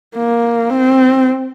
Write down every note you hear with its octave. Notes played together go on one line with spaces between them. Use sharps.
A#3
C4